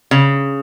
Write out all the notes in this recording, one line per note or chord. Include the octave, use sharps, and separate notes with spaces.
C#3